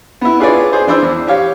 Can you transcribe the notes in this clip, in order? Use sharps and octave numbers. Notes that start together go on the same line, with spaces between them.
B3 E4
D4 F4 G#4 B4 C#5 D5
G#4 C5
E3 D4 C5 E6
E2
G4 C#5 F5